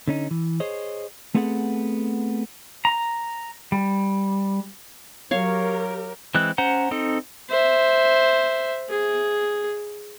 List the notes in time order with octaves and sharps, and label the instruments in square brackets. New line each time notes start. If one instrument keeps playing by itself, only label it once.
[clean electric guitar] D3 C#4 D#4
E3
G#4 C5 C#5 D#5
A3 B3 C4 G#4 A4 F#5
[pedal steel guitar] A#5
G3
[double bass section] F#3 [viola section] G4 A#4 [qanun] C#5 F5
[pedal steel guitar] E3 G#3 C4 F#6
C#4 C5 F#5 A#5
C4 D#4 A4
[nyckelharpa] C5 E5
G#4